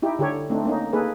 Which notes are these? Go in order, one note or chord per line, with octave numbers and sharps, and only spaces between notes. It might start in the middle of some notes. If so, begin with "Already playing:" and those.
D#4 E4 G4
D3 G4 A4 C#5
A3 C4 D4 D#4
A#3 C#4 D#4
A#3 D#4 G#4 A4 B4